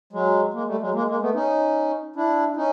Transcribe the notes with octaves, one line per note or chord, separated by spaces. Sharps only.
F#3 G#3
G#3 A#3
G3 A3
F#3 G#3
G#3 A#3
G#3 A#3
A3 B3
C#4 D#4
D4 E4
C#4 D#4